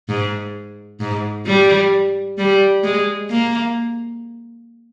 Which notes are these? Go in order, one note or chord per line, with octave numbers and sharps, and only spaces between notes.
G#2
G#2
G3
G3
G#3
A#3